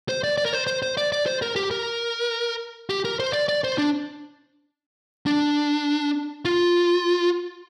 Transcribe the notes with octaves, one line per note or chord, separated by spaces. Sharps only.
C5
D5
D5
A#4
C5
C5
C5
D5
D5
C5
A#4
G4
A#4
G4
A#4
C5
D5
D5
C5
D4
D4
F4